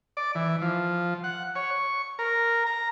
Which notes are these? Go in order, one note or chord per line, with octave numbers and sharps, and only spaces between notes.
D5
E3
F3
F#5
C#5
C#6
A#4
A#5